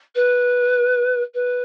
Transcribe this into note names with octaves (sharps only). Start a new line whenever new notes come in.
B4
B4